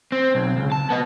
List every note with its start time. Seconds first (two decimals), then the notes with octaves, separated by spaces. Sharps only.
0.12 C4
0.35 B1
0.57 C#2
0.72 A5
0.90 B3 D#5